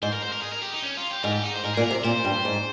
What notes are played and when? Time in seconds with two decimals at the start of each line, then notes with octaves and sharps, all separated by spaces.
0.02 G#2 C5
0.13 A#4
0.23 C5
0.33 A#4
0.42 G#4
0.53 A#4
0.63 G4
0.73 D#4
0.83 C#4
0.97 F4
1.11 G4
1.24 G#2 A#4
1.33 G4
1.43 D#4
1.54 C5
1.64 G#2 A#4
1.73 A#2 G#4
1.84 A#4
1.91 C3
2.04 A#2 C5
2.24 G2
2.45 G#2